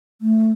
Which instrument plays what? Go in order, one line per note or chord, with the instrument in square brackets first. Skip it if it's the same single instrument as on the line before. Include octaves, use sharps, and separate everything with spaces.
[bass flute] A3